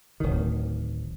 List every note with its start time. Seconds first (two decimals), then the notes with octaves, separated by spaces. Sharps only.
0.20 D1 D#3